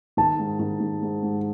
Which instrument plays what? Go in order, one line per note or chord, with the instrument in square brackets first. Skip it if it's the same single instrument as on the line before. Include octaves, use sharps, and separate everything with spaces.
[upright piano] D#3 [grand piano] A5
[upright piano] G#2
D#3
D#3
G#2
G#2